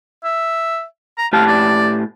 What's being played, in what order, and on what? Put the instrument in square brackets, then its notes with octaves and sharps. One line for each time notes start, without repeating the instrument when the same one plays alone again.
[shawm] E5
A#5
[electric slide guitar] A2 G4 A5 [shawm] F5
[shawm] D5